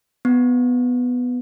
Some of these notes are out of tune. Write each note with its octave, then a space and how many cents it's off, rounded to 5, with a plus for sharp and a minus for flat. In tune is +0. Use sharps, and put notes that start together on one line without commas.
B3 +5